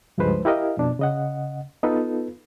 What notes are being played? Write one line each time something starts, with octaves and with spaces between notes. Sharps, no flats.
C#2 G2 F3 G#3 B4 C5
E4 G4 A#4 D#5 F5
F2 B2 D4
C#3 D#5 F#5
B3 D#4 F4 A4 B4